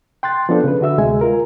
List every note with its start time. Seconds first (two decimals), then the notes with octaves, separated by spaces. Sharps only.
0.23 G5 C6 F#6 A6
0.49 F3 B3 D4 A4
0.64 C#3 B4
0.81 D3 F#4 E5 E6
0.98 D2 C3 G#3 G#5
1.21 F4 A#4